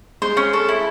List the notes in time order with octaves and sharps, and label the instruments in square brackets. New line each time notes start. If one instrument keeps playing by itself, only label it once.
[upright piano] G#3 [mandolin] C5
[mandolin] C#4
A4
E4